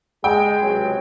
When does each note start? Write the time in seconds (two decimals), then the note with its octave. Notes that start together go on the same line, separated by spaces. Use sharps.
0.24 G#3 G#4 G5
0.61 C#2 C3 F#3